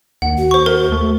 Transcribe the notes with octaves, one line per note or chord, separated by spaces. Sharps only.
D#2 F#5
F#4
C5 C#6
A#4
A3